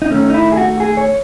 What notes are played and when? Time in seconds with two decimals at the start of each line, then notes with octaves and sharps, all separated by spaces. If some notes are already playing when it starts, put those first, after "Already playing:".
0.02 D#4
0.11 D#3 A3 C#4
0.30 D#4
0.34 E4
0.52 G#4
0.57 F#4
0.80 G#4
0.97 C#5